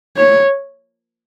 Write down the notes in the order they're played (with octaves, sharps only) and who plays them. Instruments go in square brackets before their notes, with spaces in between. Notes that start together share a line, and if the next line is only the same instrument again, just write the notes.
[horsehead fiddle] C#5